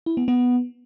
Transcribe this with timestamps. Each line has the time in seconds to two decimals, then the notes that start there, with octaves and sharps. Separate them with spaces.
0.06 E4
0.17 B3
0.28 B3